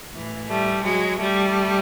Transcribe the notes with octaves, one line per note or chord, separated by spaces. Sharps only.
A2 E3
G3 A3
F#3 G#3
G3 A3